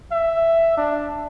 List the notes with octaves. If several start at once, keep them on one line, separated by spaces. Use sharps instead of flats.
E5
D4